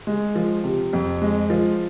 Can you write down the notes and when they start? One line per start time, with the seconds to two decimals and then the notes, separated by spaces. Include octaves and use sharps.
0.07 G#3
0.35 F3
0.64 C3
0.93 F2
1.22 G#3
1.50 F3